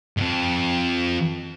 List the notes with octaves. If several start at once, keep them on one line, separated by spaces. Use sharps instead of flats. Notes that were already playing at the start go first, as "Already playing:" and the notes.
F2 G#2